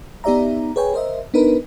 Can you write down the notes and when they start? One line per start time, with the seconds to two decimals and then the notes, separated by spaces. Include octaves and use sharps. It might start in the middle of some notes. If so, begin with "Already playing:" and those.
0.24 B3 D#4 G4 D5 E5 A#5
0.76 G#4 B4 C#5 G5 G#5
0.94 A#4 C5 D#5 E5
1.34 B3 D4 D#4 A#4 B4